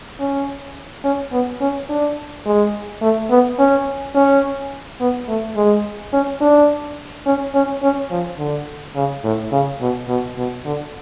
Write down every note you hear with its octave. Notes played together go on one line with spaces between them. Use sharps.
C#4
C#4
B3
C#4
D4
G#3
A3
B3
C#4
C#4
B3
A3
G#3
C#4
D4
C#4
C#4
C#4
F3
D3
C#3
A2
C#3
B2
B2
B2
D3